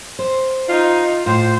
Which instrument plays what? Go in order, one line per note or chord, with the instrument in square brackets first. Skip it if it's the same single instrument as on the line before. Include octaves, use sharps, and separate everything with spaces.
[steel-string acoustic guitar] C5
[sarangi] D#4 [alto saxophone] F4
[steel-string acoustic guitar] A2 [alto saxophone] F4 [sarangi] C5